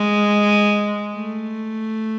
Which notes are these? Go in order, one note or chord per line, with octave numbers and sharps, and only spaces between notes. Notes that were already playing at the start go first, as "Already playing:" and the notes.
Already playing: G#3
A3